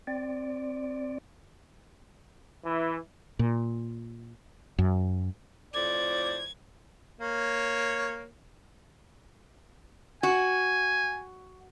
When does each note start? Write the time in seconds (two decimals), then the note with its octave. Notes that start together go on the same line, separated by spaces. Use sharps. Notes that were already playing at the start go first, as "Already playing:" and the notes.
0.07 C4 D5
2.65 E3
3.39 A#2
4.78 F#2
5.74 F2 A2 C5 D5 G#6
7.20 A#3 C#5
10.23 F#4 G#5